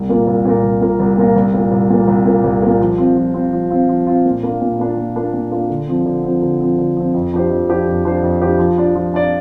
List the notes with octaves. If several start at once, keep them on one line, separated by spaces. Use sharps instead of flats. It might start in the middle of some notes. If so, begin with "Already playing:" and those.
Already playing: C2
A#2 A#3 F4 A#4
C2
A#2 A#3 F4 A#4
C2
A#2 A#3 F4 A#4
C2
A#2 A#3 F4 A#4
C2
A#2 A#3
C2
A#2 A#3
C2
A#2 A#3
C2
A#2 A#3
F3
C4 F4
F3
C4 F4
F3
C4 F4
F3
C4 F4
A#2
A#3 D4 F4
A#2
A#3 D4 F4
A#2
A#3 D4 F4
A#2
A#3 D4 F4
D3
F3 C4
D3
F3 C4
D3
F3 C4
D3
F3 C4
F2
F3 D4 G4 C5
F2
F3 D4 G4 C5
F2
F3 D4 G4 C5
F2
F3 D4 G4 C5
F3
D4 F4 D5
F3
D4 F4 D5